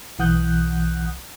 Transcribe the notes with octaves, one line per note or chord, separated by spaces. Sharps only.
B1 E3 F#5 D#6 F#6 G6